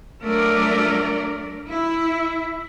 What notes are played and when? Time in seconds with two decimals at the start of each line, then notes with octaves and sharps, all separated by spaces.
0.22 F#3 A3 D4 A#4 D5
1.69 E4